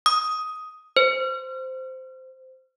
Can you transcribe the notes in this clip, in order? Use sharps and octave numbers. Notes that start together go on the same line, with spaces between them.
D#6
C5